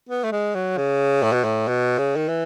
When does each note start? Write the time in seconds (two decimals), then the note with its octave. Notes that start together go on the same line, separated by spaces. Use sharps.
0.09 B3
0.24 A3
0.32 G#3
0.55 F#3
0.77 C#3
1.23 A2
1.33 B2
1.44 A2
1.68 B2
1.99 C#3
2.16 D#3
2.29 E3